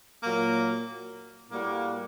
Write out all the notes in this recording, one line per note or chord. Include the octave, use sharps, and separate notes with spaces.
A#2 F#3 A#3
A2 G3 A#3 F#4